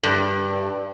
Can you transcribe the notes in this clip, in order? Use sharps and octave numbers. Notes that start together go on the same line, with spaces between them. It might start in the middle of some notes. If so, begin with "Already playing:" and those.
G2